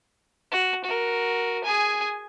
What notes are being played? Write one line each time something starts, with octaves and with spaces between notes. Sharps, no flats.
F#4
F#4 A#4
G#4 G#5